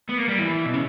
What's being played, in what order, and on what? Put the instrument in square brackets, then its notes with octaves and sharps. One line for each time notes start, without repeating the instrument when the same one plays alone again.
[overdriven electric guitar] B3
A#3
G3
E3
B2
C#3